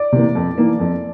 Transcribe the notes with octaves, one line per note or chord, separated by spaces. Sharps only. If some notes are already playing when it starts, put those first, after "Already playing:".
Already playing: D5
C3 E3 A#3
F2
E3 A#3
F2